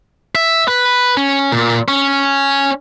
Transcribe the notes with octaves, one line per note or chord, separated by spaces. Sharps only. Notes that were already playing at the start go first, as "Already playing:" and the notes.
E5
B4
C#4
A#2
C#4